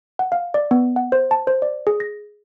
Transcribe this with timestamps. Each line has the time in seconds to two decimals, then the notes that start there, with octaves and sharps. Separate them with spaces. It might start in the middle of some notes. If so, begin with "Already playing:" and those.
0.19 F#5
0.32 F5
0.54 D5
0.71 B3
0.96 F#5
1.12 C5
1.31 A5
1.47 C5
1.62 D5
1.87 G#4
2.00 A#6